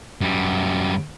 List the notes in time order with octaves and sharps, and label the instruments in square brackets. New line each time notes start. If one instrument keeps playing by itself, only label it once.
[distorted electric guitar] F#2 G3